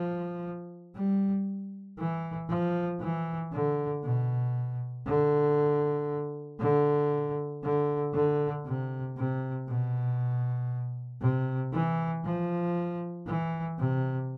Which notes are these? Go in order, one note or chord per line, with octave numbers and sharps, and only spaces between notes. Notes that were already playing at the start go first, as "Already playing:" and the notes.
Already playing: F3
G3
E3
F3
E3
D3
B2
D3
D3
D3
D3
C3
C3
B2
C3
E3
F3
E3
C3